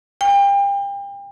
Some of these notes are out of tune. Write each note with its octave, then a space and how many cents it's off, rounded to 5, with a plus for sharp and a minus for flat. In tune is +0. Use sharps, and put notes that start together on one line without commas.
G5 +35